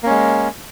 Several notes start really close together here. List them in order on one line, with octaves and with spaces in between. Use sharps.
A#3 C#4 G#3